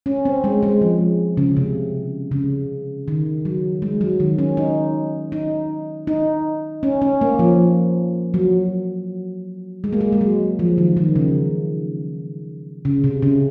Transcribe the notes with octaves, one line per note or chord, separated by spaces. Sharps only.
C#4
C4
G#3
G#3
F3
C#3
C3
C#3
D#3
F#3
G#3
F#3
D#3
C#4
D#4
D#4
D#4
C#4
C#4
A#3
F3
F#3
G#3
A#3
G#3
G#3
F#3
F3
D#3
D#3
C#3
C#3
C3
C#3